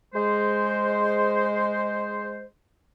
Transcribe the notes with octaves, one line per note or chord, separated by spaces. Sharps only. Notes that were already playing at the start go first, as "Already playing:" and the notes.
G#3 C5